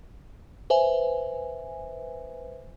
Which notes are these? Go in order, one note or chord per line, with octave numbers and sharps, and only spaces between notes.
B4 C5 E5 G#5